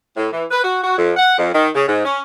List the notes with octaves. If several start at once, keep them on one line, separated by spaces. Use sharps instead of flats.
A2
E3
B4
F#4
F#4
F2
F#5
F2
D#3
C#3
G#2
C#4